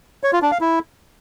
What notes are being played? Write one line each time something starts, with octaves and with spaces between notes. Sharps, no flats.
C#5
F4
D4
F5
E4